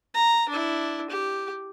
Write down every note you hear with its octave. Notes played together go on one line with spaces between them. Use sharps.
A#5
D4 E4
G4